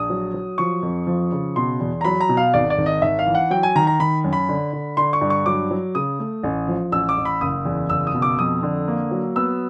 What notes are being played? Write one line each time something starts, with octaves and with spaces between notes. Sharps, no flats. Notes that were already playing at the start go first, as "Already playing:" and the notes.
Already playing: A#1 D#6
F#3
F#3
F3 C#6
F2
F3
C#3
B2 C6
E2
A#5
F#3 B5
A#5
B2
F5
G#1 D5
D5
G#1
D#5
G#1 E5
F5
E3
F#5
F#3 G5
G#5
D#3 A#5
A#5
D#3 B5
F#2
B5
D3
D3
D3 C6
C#6
G2
C#6
F#3 D6
F#3
C#3 D#6
A3
A1
F3
A1 E6
D6
A1
B5
F#1 D#6
E2
F#1 E6
D#6
B2
D6
F2 D#6
D3
A#3
F#3
B3 E6